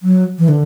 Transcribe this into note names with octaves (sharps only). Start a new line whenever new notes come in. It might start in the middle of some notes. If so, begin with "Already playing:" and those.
F#3
E3
D3